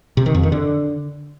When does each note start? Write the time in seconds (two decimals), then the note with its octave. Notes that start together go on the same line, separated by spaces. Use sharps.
0.17 C3
0.26 D#3
0.35 F2
0.43 D#3
0.52 D3